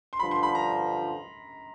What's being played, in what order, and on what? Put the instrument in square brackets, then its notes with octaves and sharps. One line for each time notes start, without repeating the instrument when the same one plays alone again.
[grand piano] C6
[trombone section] G2 D3 F3 [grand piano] B5
[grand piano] C6
B5
A#5